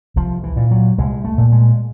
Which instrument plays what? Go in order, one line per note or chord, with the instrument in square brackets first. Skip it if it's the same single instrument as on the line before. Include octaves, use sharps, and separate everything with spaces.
[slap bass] C2 F3
E3
A#2
F#3
C2 G#3
A3
A#2
G#3